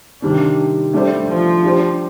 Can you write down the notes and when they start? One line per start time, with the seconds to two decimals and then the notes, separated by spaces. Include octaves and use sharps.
0.22 C3 D#3 G3 C4 D4
0.93 G3 A3 D4 G4 C5
1.28 F3
1.63 G3 D4 G4 C5